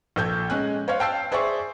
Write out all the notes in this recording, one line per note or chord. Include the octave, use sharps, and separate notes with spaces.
A#1 A4 G6 G#6
G#3 C#4 G#5 F#6
C5 C#5 F5
F5 G5 A5 E6 C7
G#4 C5 D5 E5 C#6